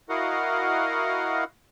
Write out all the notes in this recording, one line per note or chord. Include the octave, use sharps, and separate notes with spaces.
E4 F#4 A#4 D#5 F5 F#5